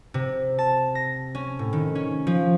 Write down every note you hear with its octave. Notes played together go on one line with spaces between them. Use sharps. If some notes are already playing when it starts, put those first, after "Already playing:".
C3
A5
A#6
C#4
A2
D#3
C#4
F3